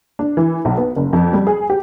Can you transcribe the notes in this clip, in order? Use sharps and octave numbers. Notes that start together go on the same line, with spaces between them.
D4
E3
B1
B3
F#1
F2
G3
G#4
G4